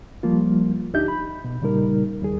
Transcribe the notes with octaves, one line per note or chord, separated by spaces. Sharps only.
F3 G3 A#3 F4
D2 D4 D#4 G4 E5 G6
B5
B2
A#2 C#3 G3 D#4 A#4
D#2 G3 G#4